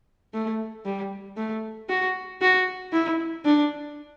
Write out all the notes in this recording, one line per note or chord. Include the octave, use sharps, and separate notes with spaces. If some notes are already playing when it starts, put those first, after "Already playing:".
A3
G3
A3
F#4
F#4
E4
D4